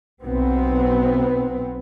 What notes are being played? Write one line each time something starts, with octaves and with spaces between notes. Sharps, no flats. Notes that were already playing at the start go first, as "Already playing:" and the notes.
B1 B3 C4